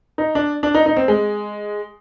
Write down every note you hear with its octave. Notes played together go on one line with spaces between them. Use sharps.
D#4
D4
D4
D#4
D#4
C4
G#3